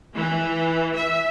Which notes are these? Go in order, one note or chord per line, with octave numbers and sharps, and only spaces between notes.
E3
E5